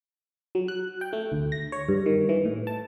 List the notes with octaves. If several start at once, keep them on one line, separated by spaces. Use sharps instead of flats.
F#3
F#6
G5
A3
D2
A#6
C#5
G2
D#3
E3
A2
A5